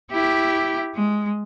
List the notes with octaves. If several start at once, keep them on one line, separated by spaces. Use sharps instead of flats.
E4 G4
G#3